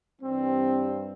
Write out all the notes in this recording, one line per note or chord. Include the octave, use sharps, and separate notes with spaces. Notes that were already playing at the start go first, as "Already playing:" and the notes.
G2 E3 G3 C4